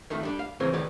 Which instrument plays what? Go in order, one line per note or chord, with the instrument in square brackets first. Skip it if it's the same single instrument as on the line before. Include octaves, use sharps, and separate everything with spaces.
[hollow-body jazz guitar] F2 D#3 A3
G3 D4
F5
C#3 E3 C4 G#4 A#4
A2 D#3 G#3 B4 D5